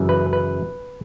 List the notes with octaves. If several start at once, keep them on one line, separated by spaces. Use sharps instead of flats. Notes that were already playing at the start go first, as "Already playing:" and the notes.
Already playing: F#2 C#3 E3
B4
B4